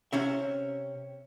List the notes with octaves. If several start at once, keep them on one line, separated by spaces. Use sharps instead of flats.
C3 C#4 E5